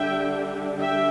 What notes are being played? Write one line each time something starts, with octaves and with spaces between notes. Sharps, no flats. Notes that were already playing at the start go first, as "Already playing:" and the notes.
Already playing: D3 G3 D4 E5 G5
E5 G5